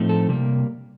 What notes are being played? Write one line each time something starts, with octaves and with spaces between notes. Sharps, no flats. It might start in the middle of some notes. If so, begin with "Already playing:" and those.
Already playing: A2 F3 A3 C4 D#4
A4
C3 G3 A#3